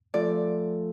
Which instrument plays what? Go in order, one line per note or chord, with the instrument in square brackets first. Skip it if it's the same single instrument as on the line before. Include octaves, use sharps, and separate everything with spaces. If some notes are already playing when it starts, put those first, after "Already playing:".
[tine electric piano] F3 A3 F4 A4 [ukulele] D5